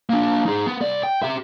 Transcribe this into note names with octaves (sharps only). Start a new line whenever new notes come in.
A#3 D4
D#4 G#4
B3
C2 D5
G5
G4 E5